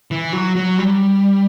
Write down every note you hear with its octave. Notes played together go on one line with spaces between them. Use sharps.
E3
F#3
F#3
G3